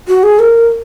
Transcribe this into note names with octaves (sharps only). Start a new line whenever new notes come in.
F#4
G#4
A#4